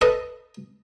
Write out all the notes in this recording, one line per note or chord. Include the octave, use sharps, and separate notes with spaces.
A4 B4 D#5